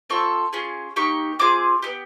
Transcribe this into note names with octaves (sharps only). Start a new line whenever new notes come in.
C4 F4 A4 C#6
C#4 F4 G#4
A#3 D#4 G4 C#6
C4 F4 G#4 D6
B3 D#4 G4